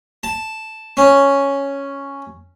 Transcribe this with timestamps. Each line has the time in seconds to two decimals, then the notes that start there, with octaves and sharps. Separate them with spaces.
0.23 A5
0.97 C#4